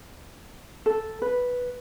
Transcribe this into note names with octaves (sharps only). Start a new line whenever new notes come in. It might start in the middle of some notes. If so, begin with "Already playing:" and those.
A4
B4